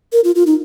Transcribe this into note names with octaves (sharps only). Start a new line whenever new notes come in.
A#4
F4
F4
D#4